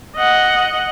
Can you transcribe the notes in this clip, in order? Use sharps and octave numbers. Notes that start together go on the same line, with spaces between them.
D#5 F#5